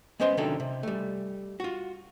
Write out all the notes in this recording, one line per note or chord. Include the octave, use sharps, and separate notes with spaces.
G#3 B3 C#4 C5 D#5 C6
C3 D#3 F#3 C#4 D4 A4
C3
G3 A3
F4 F#4